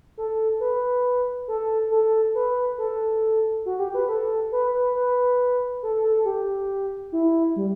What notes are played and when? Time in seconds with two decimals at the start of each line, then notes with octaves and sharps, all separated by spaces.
0.18 A4
0.60 B4
1.48 A4
1.91 A4
2.35 B4
2.78 A4
3.66 F#4
3.79 G4
3.95 B4
4.09 A4
4.52 B4
4.74 B4
4.95 B4
5.83 A4
6.04 A4
6.25 G4
7.12 E4
7.56 G3